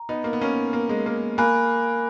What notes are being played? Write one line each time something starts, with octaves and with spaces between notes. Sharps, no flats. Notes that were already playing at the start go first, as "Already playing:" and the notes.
Already playing: A#5
B3 D#4
A#3
B3
A#3 C#4
A#3
G#3
A#3
A#3 G#5 B5 F#6